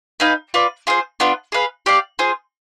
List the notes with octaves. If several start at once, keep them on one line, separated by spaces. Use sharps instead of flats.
D#4 B4 F5 G#5
F4 B4 D5
F4 G#4 C5
B3 D4 F4
G#4 B4 F5
G4 D5 F5
F4 G#4 C5